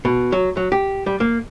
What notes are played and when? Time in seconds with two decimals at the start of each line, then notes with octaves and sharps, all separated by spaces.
0.05 B2
0.32 F#3
0.57 F#3
0.72 G4
1.06 G3
1.20 A#3